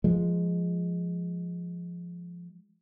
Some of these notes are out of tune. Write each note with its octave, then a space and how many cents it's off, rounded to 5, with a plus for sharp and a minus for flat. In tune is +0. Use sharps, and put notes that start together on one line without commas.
F3 +0 G#3 +0